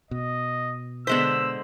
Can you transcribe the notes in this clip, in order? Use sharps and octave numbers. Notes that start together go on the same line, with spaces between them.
B2 D#5
D3 G#3 B3 C5 E6 B6